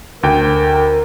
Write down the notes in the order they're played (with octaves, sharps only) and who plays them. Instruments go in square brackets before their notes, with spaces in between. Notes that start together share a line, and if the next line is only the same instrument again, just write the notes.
[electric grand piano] D2 G5 [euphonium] A#4